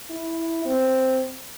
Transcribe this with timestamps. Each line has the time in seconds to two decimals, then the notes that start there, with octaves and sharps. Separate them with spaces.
0.10 E4
0.65 C4